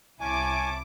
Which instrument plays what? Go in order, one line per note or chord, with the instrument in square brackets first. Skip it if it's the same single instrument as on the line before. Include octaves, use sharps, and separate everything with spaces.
[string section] C2 E4 D6 [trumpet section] C#4 A5 C#6 [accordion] G#5